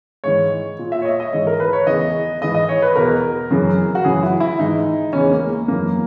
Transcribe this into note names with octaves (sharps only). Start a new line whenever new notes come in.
G#2 E3 C#5
A#2
E5
C#5
D#5
D#5
G#2 E3 C#5
A#4
B4
C#5
E2 C#3 E3 D#5
G#2 E3 D#5
D#5
C#5
B4
E2 B2 A#4
F#2 C#3 E3
F#4
F#2 C#3 E3 G#4
E4
E4
G#2 E3 D#4
E2 C#3 E3 C#4
A#3
F#2 E3 A#3